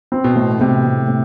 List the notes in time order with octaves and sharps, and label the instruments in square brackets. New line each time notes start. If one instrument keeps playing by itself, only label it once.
[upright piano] C4
[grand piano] B2
[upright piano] A2
[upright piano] A2 [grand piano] C3
[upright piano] A2
A2